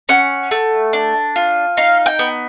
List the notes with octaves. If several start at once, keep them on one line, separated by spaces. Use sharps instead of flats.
C#4 F#5
A3
D4
F4
D#4 F5
G5
B3